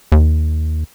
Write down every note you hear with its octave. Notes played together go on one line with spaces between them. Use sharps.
D#2